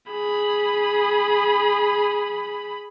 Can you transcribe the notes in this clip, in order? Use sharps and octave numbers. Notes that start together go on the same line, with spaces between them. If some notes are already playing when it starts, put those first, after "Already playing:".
G#4 B5